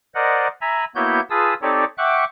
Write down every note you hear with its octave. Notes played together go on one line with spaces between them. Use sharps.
A#4 C5 D5 D#5 F#5
E5 G#5 A#5 B5
A#3 B3 E4 F#4 C#5 G6
F4 G#4 B4 A5 D#6 E6
C4 D#4 G4 A4 C#5 D5
E5 F#5 G5 C#6 D6 F#6